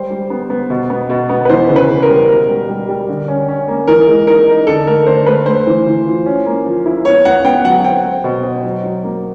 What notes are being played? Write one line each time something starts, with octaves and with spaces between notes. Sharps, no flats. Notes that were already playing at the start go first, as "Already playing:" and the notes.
Already playing: G3 C5
G3
B3
B3
B2
B3
B2
B3
B4
E3 C5
C#3
B4
C#3
A#4
G3
B2 A#4
G3
G3
G3
D3
C#4
C#4
A#3
E3 A#4
G#3
D#4 A#4
D#4
D3 A4
A3 A#4
D3 C5
A3 B4
A3 C5
E3
E3
F4
C#4
A#3
F3
E4
B3 C#5
B3 F#5
B3 G5
F#3 F#5
C4 G5
C4
B2
C4
F#3
F#3
A#3